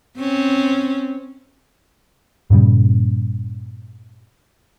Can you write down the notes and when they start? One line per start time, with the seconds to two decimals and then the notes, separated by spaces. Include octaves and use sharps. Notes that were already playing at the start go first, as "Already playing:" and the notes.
0.17 C4 C#4
2.50 G2 A#2 C#3 G3